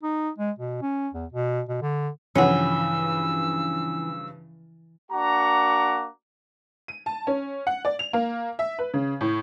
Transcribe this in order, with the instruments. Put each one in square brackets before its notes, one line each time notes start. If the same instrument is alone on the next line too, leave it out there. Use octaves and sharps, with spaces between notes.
[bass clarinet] D#4
G#3
B2
C#4
E2
B2
B2
D3
[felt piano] G2 C#3 F3 [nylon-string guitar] E3 [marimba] C#5 F#5 [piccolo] E6
[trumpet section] A#3 D4 F#4 F#5 A#5 D6
[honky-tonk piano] D#7
A5
C#4
F#5
D5
F7
A#3
E5
B4
C#3
A2